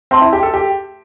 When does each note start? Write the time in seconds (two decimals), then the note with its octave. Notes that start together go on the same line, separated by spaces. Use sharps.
0.11 C4 B4 E5 A5 C6
0.21 E4
0.33 G4
0.43 A4
0.54 G4